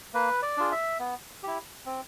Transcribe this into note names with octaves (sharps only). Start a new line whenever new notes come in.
A#3 B4
D5
D4 F4 G#4
E5
B3
E4 G4
C4